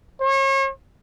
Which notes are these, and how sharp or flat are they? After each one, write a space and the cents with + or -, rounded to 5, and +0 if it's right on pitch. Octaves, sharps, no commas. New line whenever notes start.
C#5 -35